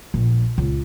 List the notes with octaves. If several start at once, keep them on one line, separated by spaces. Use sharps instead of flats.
A#1
C#2